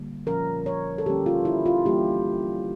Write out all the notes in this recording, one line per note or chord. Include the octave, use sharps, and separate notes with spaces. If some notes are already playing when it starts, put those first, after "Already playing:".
Already playing: D3 G3 A#3
A#2 F3 C#4 A#4
C#5
A4
D3 G3 A#3 C#4 G4
F4
E4
F4
E3 G3 A#3 D4 G4